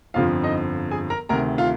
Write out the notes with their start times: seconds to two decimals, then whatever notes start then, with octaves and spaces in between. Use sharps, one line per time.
0.14 G1 F2 D3 F3 F4 F5
0.43 D#4 D#5
0.91 G#4 G#5
1.10 A#4 A#5
1.29 D2 C3 D#3 A#4 A#5
1.58 F4 F5